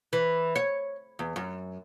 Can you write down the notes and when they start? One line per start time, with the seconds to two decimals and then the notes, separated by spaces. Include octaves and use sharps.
0.13 E3
0.56 C#5
1.19 E2
1.36 F#2